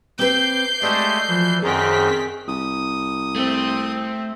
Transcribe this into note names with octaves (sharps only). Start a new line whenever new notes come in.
C4 B4 D6 G6 C7
G#3 A3 F#4 G4 A4 D5
E3 F3
F#2 D#3 C4 G#4 B6
C2 D#6
A3 C4